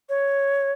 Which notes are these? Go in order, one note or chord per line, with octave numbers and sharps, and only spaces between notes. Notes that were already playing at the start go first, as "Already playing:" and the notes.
C#5